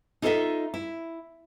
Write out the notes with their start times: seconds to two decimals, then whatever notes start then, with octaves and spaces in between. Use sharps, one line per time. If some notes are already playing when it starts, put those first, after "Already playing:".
0.22 D#4 F4 A4 C5 D#5 E5
0.74 E4